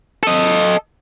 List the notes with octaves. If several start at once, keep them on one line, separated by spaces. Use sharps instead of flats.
A4 D#5